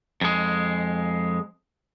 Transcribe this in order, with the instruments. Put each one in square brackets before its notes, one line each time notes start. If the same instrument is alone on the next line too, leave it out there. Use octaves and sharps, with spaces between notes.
[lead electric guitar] F2 G#3